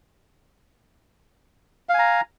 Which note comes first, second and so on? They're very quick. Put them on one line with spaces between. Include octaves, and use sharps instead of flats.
F5 G#5 A#5